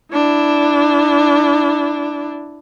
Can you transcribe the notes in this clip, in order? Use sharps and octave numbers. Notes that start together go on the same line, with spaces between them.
D4 E4